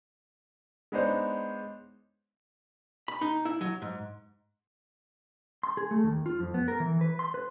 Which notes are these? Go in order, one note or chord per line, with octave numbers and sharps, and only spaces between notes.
G#3 B3 D4 D#4 C5 C#5
B5
D#4
E4
F#3
G#2
C6
G#4
A3
D#2
F4
F2
B3
A#4
E3
B4
C6
B4